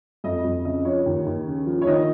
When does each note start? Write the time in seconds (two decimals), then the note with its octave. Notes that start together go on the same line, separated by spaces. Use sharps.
0.24 F2 D#5
0.44 F2
0.65 C#3 D#5
0.85 F3 C#5
1.06 D#2
1.26 D#2
1.46 C#3
1.66 F3
1.82 C#5
1.87 D#3 D#5